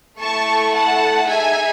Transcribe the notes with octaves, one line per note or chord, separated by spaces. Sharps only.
A3 E4 A4 A5 C#6
F#5 A5
D#4 G#4 E5 G#5